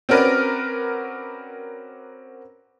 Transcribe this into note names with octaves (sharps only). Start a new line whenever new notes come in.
C4 C#4 F#4 A#4 B4 D5